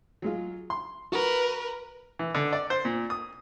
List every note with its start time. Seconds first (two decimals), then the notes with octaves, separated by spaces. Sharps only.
0.22 F#3 G#3 F4
0.70 C6
1.12 F#4 A#4 B4
2.19 E3
2.35 D3
2.53 D5
2.70 C5
2.85 A#2
3.10 D#6